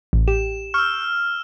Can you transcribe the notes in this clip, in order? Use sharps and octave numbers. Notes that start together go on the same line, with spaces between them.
A1
G4 E7
C#6 E6 F6 G6